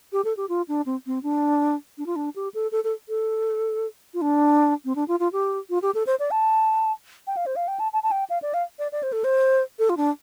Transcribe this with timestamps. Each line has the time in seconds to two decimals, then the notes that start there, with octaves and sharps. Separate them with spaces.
0.12 G4
0.24 A4
0.37 G4
0.49 F4
0.68 D4
0.86 C4
1.06 C4
1.23 D4
1.98 D4
2.06 F4
2.16 D4
2.36 G4
2.54 A4
2.72 A4
2.84 A4
3.09 A4
4.14 F4
4.21 D4
4.85 C4
4.95 D4
5.08 F4
5.20 F4
5.32 G4
5.70 F4
5.82 G4
5.94 A4
6.07 C5
6.19 D5
6.31 A5
7.27 G5
7.37 F5
7.46 C5
7.56 F5
7.68 G5
7.79 A5
7.93 A5
8.03 A5
8.11 G5
8.30 F5
8.42 D5
8.54 F5
8.79 D5
8.92 D5
9.03 C5
9.12 A4
9.24 C5
9.79 A4
9.89 F4
9.97 D4